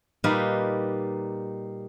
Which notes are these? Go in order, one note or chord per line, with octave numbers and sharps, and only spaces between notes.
A#2 G3 D#4 B4 F5